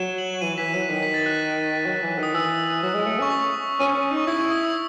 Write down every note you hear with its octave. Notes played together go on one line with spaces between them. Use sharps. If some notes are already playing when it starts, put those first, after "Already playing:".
Already playing: F#3 E7
F#7
E7
E3 D#7
E3 B6
F#3 D#7
D#3 B6
B6
A6
F#6
F#3
E3
D#3 D#6
E3 E6
F#3
G#3
A3
C#4 C#6
D#6
C#4
C#4
D#4
C#6
E4 D#6
C#6
D#6
E6